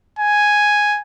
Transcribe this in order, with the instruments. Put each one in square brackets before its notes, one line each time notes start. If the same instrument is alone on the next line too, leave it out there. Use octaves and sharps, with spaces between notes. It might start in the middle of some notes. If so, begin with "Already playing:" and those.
[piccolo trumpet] G#5